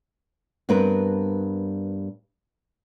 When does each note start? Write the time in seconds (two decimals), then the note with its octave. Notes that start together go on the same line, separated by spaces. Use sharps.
0.69 G2 B3 C4 A#4 B4